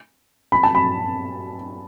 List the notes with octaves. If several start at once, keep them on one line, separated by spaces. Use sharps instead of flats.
B5
A5
B5